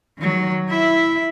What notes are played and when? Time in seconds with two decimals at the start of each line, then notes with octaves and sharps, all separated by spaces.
0.18 D#3 F#3
0.69 E4 E5